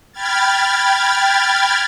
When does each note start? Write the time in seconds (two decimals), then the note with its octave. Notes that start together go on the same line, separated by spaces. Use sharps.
0.12 G5 B5 F6 G#6 A6